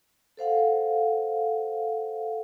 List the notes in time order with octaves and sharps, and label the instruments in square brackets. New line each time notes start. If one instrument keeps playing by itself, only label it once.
[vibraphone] A4 C5 F5 F#5